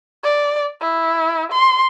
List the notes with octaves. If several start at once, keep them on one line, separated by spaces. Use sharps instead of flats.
D5
E4
C6